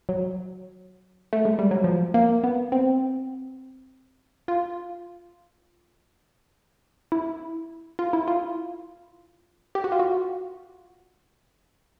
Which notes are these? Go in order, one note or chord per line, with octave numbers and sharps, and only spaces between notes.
F#3
A3
G#3
G3
F#3
F3
A#3
B3
C4
F4
E4
F4
E4
F4
G4
F#4
F4
F#4